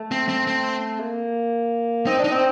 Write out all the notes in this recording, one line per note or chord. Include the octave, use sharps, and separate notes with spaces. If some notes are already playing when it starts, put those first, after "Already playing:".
Already playing: A3
C4
C4
C4
A#3
C4 D#4
D4
D#4
C4